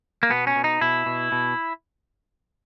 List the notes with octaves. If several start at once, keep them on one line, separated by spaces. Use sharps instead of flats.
A#3
B2 B3
C#4
B2
D#4
B2 E4
B2
B2